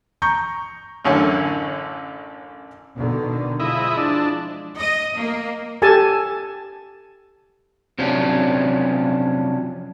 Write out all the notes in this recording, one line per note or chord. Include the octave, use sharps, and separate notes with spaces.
A#5 C#6 G6
A1 F#2 D3 C#4 E4 F#5
B2 D3 D#3
F3 G#3 E4 D#5
D4
D#5
A#3
G4 A4 G#5 A5
C3 F3 F#3 C#4 D4